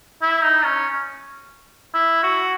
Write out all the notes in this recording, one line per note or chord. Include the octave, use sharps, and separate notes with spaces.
E4
D#4
C#4
E4
F#4